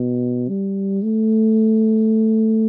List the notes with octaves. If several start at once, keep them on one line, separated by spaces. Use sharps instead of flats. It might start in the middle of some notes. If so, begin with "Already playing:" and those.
Already playing: B2
G3
A3